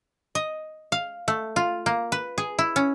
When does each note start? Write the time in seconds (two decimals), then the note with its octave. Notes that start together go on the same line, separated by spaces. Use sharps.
0.35 D#5
0.92 F5
1.28 A3
1.56 F4
1.86 A#3
2.12 B4
2.38 G#4
2.59 E4
2.76 C#4